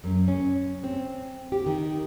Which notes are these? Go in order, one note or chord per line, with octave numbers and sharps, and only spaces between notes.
F#2
C#4
C4
G4
D#3